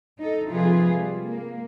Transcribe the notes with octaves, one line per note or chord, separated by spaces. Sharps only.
D#4 A4
C3 F3 F4 G#4 B4
G3
A#3